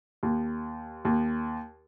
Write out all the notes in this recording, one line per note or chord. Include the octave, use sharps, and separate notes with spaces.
D#2
D#2